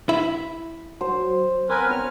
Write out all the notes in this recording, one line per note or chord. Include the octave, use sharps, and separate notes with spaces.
E4 E5
F#3 C5
B3 C4 A#4 B4 G#5
C#5 F6